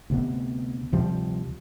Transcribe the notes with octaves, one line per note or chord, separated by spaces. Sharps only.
D2 C3 B3
D2 C3 F3 G3